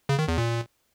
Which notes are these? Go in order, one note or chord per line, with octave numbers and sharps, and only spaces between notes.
C#3
D#3
E2
A#2